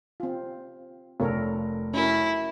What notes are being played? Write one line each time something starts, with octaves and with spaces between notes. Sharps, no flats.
C4 F4
F1 A4 A#4 C#5
C#4 E4 F#4 A#4